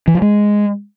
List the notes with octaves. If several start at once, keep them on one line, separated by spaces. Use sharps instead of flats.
E3
F3
G#3